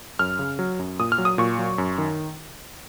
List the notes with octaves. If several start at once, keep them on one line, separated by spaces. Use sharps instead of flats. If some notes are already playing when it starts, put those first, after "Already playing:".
F#2 F6
C#3
F#3
F#2
A#2 D#6
F6
F#3
D#6
A#2 C#6
F#3
F#2
D#3